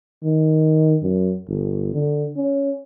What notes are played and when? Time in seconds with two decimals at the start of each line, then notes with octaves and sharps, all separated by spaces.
0.23 D#3
1.02 F#2
1.49 G1
1.94 D3
2.36 C#4